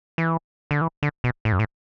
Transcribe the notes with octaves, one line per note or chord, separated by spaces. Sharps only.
E3
D3
E3
D3
B2
A2
F#2
A2